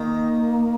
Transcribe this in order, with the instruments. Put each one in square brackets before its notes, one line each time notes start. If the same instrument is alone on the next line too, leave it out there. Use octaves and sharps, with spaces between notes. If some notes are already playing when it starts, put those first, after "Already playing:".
Already playing: [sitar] D#3 [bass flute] A#3